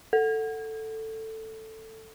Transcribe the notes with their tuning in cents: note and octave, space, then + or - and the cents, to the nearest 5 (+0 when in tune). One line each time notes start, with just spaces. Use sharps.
A4 +10